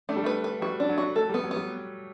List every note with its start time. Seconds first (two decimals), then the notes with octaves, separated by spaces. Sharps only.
0.09 A3 D4
0.16 G3
0.24 A3 B4
0.44 B4
0.62 G3 F#4
0.80 D4
0.89 F#3
0.98 F#4
1.16 A3 A4
1.29 G3 B3
1.43 F#3
1.51 B3
1.56 G3